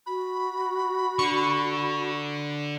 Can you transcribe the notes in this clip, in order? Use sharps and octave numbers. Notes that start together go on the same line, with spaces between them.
F#4 B5
D3 C#6